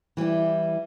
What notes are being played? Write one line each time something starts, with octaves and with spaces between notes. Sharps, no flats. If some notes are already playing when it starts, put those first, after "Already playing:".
E3 G3 E4 G4